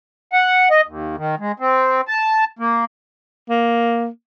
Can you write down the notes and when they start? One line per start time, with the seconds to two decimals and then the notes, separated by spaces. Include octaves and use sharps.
0.33 F#5
0.70 D#5
0.87 D#2
1.18 D#3
1.39 G#3
1.60 C4
2.08 A5
2.59 A#3
3.49 A#3